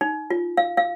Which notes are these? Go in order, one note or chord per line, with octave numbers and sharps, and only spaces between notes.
D#4
F4
F5
F5